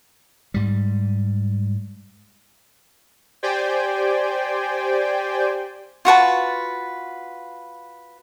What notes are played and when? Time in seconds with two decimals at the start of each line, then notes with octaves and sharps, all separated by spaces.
0.54 G#2 G3
3.43 G4 C5 D5 G5 G#5
6.05 F4 F#4 B4 A5